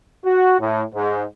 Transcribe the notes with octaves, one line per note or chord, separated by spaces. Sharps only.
F#4
A2
G#2